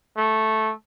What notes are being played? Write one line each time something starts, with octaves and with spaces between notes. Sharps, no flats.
A3